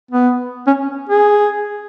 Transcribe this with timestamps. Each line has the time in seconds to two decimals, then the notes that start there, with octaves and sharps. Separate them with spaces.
0.11 B3
0.67 C#4
1.09 G#4